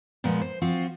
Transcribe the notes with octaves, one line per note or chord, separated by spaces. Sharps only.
A#2 F3 G#3 B3
C5
F3 C4 F4 F#4